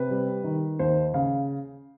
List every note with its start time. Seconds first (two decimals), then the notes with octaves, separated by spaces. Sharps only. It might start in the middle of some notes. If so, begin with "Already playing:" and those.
Already playing: C3 B4
0.10 G3
0.44 D#3
0.79 D#2 C5
1.14 C#3 F5